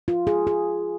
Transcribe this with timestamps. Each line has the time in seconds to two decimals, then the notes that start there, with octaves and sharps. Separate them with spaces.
0.08 F4
0.27 G#4
0.47 G#4